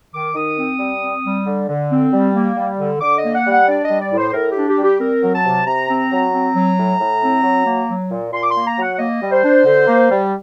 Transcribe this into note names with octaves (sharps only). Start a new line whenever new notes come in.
D#3 D6
D#3 D#6
C4
G3
C4
G3
D3
D3
C4
G3
A#3
G3
D3
D3 D6
D#5
A#3
F#5
G3
F#5
D4 D5
D#5
G3
D5
A2
C5
A2 A#4
G4
D4
G4
G3
G4
C4 A#4
F#3
A5
C3
C3 A#5
C4
F#3
C4
F#3
A2
A2
C4
F#3
A#3
F#3
A#2
A#2 C6
D6
C6
A#3
A#5
F#3 F#5
A#3 D#5
G3
C5
D4
D3
A#3
G3